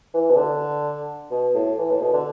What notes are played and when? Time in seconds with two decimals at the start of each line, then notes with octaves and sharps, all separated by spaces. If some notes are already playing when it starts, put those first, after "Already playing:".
0.14 E3
0.30 B2
0.36 D3
1.31 B2
1.54 A2
1.78 E3
1.91 A2
2.00 B2
2.13 D3